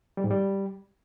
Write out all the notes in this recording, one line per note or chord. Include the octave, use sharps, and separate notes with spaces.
G3
G#2
G3